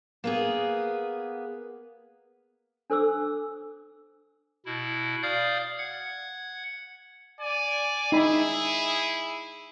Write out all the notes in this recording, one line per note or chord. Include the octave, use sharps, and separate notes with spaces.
A#3 B3 G#4
D4 A4 C5 D6 E6
B2 E4
D5 F5 D#6 F6 G6
F#5 G#6
D5 G#5
D#4 E4 G#4 B5